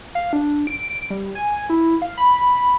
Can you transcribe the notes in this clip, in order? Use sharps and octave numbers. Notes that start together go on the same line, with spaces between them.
F5
D4
D7
G3
G#5
E4
F5
B5